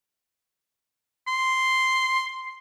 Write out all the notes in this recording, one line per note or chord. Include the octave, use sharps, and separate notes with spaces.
C6